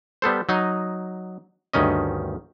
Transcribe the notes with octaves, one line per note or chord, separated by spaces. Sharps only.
G3 B3 A4 C5
F#3 D#4 D#5
D2 G2 D#3 C#4 D#5